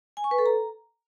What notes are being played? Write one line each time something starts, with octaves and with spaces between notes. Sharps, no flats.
G#5
C#6
B4
A4
A#5